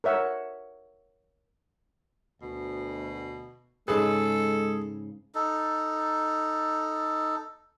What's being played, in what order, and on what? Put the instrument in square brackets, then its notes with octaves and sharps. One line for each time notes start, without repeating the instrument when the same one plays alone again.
[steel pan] A#4 C#5 E5 F#5
[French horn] D2 [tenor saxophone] B2
[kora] G#2 C#3 B4 [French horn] G#3 [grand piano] G#4 [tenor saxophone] A4
[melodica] D#4 A4